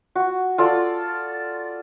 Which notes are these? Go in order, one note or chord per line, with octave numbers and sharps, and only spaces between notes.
F#4
F4 A4 D5